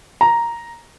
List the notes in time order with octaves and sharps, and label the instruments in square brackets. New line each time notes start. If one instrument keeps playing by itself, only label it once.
[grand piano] A#5